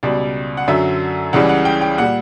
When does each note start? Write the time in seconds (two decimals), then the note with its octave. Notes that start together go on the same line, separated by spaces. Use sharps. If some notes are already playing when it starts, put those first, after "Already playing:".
0.03 C#2 B2 G3 D5
0.57 F#5
0.68 F#2 D3 F#3 E5
1.33 C#2 C#3 E3 G3 F#5
1.49 F#5
1.65 G5
1.81 G5
1.98 A#2 G3 F#5